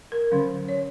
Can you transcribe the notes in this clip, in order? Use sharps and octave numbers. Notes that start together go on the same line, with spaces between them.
A#4
D3 F#3 C#4
C#5